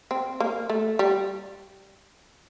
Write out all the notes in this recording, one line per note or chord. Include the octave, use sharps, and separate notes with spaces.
C4
A#3
A3
G3